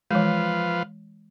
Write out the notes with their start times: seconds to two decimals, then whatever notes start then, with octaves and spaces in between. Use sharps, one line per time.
0.11 E3 F3 G#3 B4 F5